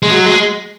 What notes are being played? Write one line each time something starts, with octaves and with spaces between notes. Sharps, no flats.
G#3
F#3
G#3